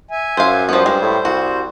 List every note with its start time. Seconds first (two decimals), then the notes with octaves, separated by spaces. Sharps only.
0.11 E5 G#5
0.37 F#2 C5 F5
0.69 F3 G3 B3 C5
0.86 G2 G#3
1.02 A2
1.25 C2 F#4